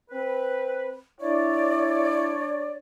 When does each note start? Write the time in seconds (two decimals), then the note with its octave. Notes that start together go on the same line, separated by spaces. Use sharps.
0.11 C4 B4
1.21 D4 E4 C#5 D5